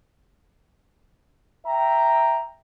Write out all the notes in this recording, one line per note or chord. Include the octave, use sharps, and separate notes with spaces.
E5 G5 A#5